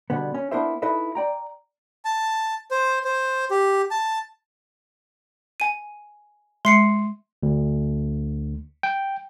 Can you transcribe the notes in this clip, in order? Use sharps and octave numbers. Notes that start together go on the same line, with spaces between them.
B2 D3 G3 B3
C#4
B3 D4 E4 A#4 C5 E5
D#4 E4 A4 B4 D#5 E5
D5 G5 A#5
A5
C5
C5
G4
A5
G#5 D#7
G#3 C6 C7 C#7
D2
G5